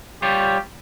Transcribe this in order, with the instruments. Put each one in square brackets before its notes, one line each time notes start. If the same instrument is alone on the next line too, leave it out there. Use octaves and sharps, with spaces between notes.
[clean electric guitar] G3 F4 C#5 [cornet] G4